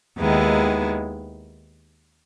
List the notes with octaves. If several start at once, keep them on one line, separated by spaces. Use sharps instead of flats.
D#2 D#3 G#3 B3 E4